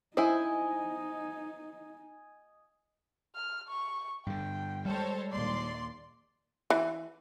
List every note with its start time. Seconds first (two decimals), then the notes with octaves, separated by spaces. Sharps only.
0.17 D#4 E4 C5 D#5 G#5
3.35 F6
3.68 C#6
4.26 G2 D3 G5
4.85 G3 G#3 A4 C5 C#5
5.32 A#1 D#2 D5 C6
6.70 E3